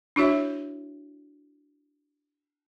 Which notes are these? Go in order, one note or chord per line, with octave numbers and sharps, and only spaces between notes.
D4 E4 F#4 C#5 E5